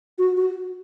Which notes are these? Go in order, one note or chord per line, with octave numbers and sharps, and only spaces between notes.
F#4
F#4